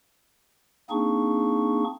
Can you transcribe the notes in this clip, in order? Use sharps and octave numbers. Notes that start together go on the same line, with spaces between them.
A#3 C4 D4 D#4 G#4 C#6